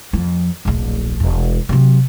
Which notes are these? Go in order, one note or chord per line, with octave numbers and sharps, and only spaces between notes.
F2 F3
D1 A#1
E1
C3 F#3